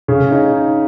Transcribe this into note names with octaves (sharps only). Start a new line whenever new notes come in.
C#3 G#4
D#4